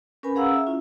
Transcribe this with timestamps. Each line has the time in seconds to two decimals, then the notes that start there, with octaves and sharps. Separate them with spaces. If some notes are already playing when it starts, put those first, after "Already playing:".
0.23 C#4 A#4 B4 G#5 B5
0.35 C#4 G#4 F5 F#5 A#5 E6
0.54 E5
0.67 C#4 E4 F4